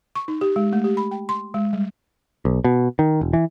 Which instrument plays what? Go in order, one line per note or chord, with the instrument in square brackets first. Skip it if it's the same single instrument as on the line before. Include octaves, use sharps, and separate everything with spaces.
[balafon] C#6
D#4
G4
G#3
A3
G4
B5
G5
C6
G#3
G3
[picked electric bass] B1
B2
D#3
E1
E3